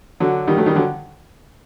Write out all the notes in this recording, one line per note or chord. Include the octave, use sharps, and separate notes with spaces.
D3 F#3
D#3 G3
F#3 A3
D#3 G3
D3 F#3